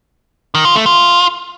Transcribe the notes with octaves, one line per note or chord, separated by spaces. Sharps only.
D#3
F4
A3
F4